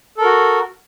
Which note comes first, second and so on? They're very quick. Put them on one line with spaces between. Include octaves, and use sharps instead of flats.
A4 A#4 F#4